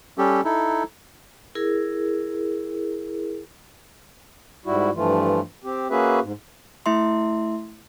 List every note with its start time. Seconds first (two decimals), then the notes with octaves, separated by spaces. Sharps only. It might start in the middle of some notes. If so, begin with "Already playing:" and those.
0.18 G3 C#4 G4 A4
0.45 D#4 E4 A4
1.55 E4 G#4 A#4
4.66 G#2 G3 E4 F#4
4.95 G2 E3 F3 A3 F4
5.64 C4 G4
5.90 A#3 C#4 F#4 G#4 B4 E5
6.21 G#2
6.86 A3 E4 E5 C6